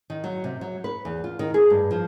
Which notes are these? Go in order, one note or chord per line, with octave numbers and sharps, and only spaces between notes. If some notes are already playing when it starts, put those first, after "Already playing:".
D#3
F#3
C3
F#3
B4
E2
F4
D#3
G#4
G2
F3